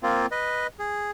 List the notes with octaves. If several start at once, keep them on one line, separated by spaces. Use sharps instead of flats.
A#3 C4 F4
B4 D#5
G#4